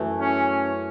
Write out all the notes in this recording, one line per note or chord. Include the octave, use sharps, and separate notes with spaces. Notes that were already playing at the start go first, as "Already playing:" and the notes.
Already playing: F#2 E3 A3
C#4